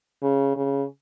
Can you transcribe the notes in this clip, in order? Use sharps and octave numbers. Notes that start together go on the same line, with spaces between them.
C#3
C#3